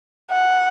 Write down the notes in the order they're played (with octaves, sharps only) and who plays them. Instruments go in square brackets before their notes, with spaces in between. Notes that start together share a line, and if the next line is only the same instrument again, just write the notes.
[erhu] F#5